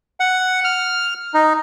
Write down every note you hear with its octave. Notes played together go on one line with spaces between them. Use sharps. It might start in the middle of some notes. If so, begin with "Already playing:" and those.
F#5
F6
D#4